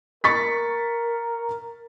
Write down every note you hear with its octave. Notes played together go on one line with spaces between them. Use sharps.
A#4 C#6 A6 B6